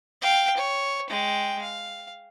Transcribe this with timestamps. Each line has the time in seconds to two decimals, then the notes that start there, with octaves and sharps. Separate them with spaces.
0.22 F5 G5
0.57 C#5
1.10 G#3 G5
1.62 F5